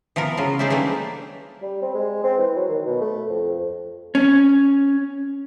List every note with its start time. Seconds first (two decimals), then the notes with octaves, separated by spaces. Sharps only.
0.16 E3 F3 B3 A#4
0.37 C#3 F#3 F4
0.59 C#4 D#4 G#4 C5 D5 E5
0.70 E3 G3 A3 A#3 D4
1.62 G3
1.82 C4
1.94 G#3
2.24 C4
2.38 E3
2.56 F#3
2.69 D#3
2.86 B2
3.01 A3
3.29 F2
4.15 C#4